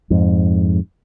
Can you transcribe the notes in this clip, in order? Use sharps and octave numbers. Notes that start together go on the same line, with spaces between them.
F2 G#2